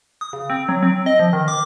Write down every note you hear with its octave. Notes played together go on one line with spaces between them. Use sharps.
D#6
C#3
C4
F#3
C4
D#5
F3
D#3
D6